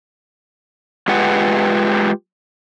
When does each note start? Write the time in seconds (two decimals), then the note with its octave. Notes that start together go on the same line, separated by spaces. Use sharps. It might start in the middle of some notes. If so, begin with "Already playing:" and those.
1.08 G#3 F4 G4 G#4 B4 F#5